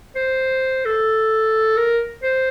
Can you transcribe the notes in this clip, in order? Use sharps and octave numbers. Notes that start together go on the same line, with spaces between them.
C5
A4
A#4
C5